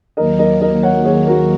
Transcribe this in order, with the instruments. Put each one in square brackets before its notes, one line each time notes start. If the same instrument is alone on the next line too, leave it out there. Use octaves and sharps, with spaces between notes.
[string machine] D#2 D#3 F#3 A#3 [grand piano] A#4 D#5
[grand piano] A#4 D#5
A#4 D#5
C#5 F#5
G#4 C#5
F#4 A#4